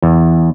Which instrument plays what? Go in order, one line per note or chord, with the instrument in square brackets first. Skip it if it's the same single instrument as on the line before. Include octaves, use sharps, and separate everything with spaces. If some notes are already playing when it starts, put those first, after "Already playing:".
[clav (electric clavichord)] E2